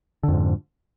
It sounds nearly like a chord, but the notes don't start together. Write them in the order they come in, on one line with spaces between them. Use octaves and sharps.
D3 F2 G#2